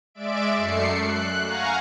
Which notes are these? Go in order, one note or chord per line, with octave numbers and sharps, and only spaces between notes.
G#3 D5 E5 D7
F#2 A3 C7 C#7
F#6
F5 F#5 G#5 A#5 C#6